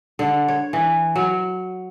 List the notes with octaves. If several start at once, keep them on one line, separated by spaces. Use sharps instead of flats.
D3
C#5
E3
F#3